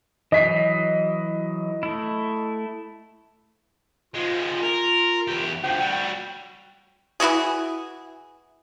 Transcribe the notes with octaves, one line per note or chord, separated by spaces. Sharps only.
E3 F#3 D#5 B6 C7
A3 E4
F3 G#3 F4
A#4
E2 G4
D2 F3 G5
G3 F#4
E3 E4 F#4 G#4